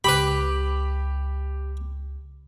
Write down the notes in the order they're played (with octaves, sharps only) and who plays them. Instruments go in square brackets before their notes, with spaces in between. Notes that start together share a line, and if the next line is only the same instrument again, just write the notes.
[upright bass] C#2 [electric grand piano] G4 D6 [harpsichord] B4 B5